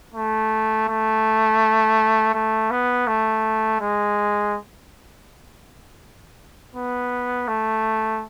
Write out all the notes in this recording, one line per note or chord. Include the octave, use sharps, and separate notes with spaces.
A3
A3
A3
B3
A3
G#3
B3
A3